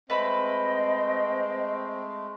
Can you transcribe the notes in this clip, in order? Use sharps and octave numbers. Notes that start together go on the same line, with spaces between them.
G#3 A3 C4 B4 D#5 E5 B5